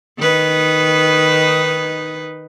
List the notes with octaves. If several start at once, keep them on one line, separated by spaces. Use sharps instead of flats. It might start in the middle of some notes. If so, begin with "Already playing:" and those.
D#3 D#4 B4